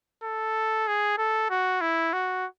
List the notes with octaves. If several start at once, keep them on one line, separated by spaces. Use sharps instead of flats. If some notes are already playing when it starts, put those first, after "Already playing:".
A4
G#4
A4
F#4
E4
F#4